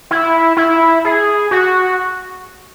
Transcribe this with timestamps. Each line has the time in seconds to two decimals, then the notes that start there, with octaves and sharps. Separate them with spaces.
0.11 E4
0.57 E4
1.05 G#4
1.51 F#4